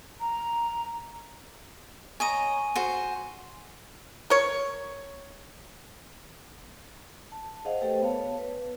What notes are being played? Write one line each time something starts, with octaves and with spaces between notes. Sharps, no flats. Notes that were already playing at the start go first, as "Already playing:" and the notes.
A#5
C#5 D#5 G#5 A#5 D#7
F#4 C5
A#4 C#5
A5
G#4 C5 D#5 F5 F#5
A3 G4 A4 B4 C5 G5
B3 C#5 F5 A5
B4